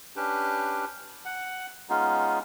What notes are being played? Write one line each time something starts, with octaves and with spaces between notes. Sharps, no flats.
C#4 D4 G4 B4
F#5
G#3 B3 C#4 D#4 F4